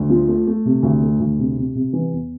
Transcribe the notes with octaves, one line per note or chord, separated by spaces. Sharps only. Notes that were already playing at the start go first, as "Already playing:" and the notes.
Already playing: D2
F3
A3
A3
C3
D2
A3
D2
C3
C3
C3
E3
E2